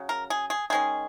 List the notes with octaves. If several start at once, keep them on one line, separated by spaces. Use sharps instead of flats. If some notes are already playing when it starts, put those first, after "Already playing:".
Already playing: C#3 F#3
A#4
G#4
G#4
D#3 G#3 C#4 G#4